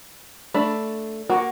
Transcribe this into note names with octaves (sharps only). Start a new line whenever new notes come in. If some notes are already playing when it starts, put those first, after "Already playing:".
A3 D4 B5
A#3 F#4